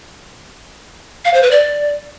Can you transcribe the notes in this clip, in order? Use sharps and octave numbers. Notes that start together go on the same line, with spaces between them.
F5
C5
B4
D5